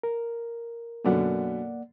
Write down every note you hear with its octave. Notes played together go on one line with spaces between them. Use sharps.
A#4
F#2 B2 D3 A#3 D5 F#5